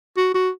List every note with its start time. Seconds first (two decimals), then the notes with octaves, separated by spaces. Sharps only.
0.17 F#4
0.34 F#4